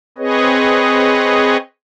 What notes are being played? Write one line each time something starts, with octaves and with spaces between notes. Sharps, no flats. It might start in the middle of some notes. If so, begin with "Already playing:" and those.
C4 G#4 B4 C#5 D#5